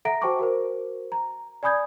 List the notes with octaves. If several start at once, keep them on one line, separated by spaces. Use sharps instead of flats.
A4 E5 F#5 A#5 A#6 D7
F#4 C5 G5 A5 C#6 D6
F#4 A#4 C5
A#5
D5 G#5 B5 D#6 G6 G#6